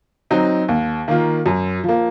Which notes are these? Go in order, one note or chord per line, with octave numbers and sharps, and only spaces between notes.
F#3 C4 D#4
D#2
D#3 A#3 F4
F#2
F3 A#3